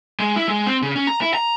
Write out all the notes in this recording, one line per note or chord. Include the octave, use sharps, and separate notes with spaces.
G#3
E4
G#3
C4
C#3
C#4
A#5
E4
A#5